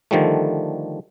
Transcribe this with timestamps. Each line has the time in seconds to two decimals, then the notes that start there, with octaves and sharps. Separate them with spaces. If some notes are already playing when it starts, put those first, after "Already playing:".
0.11 D3 D#3 F3 G3 A3